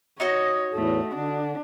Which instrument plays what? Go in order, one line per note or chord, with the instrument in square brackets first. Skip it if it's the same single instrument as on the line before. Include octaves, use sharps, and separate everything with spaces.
[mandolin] D#4 F#4 D#5 [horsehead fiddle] C#5
[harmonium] E2 A2 [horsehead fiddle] A3
[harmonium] D3 [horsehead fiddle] D4